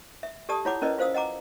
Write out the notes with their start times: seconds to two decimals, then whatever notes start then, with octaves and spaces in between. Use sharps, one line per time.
0.23 E5
0.49 G4 A4 D5 A5 D#6
0.65 E4 F4 C#5 F#5 B5 D6
0.82 C#4 E4 A#4 B4 D5 D#5
0.98 F4 C5 F5 D#6 E6
1.14 D#5 F#5 A#5 D6